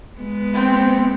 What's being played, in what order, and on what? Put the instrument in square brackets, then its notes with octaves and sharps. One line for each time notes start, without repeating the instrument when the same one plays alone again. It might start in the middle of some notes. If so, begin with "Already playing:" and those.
[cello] G#3 B3
[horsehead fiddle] C4